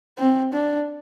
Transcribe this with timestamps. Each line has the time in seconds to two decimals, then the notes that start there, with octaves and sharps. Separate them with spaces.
0.18 C4
0.53 D4